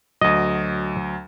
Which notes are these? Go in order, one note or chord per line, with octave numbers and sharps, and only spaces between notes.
D2 F#3 D#5